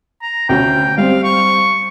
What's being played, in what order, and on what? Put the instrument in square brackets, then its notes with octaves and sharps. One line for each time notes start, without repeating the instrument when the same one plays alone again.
[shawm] A#5
[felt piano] D2 C#4 [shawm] G5
[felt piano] G3 C4 [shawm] F5
[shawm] C#6